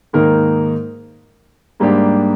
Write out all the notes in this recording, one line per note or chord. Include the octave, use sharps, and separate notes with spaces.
G#2 D#3 A#3 D#4 A#4
G#2 G3 A#3 D4 G4